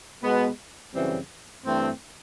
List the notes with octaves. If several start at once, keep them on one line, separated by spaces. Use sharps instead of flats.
B2 G#3 B3
F#2 C#3 E3 G3 C4
G2 E3 A3 C4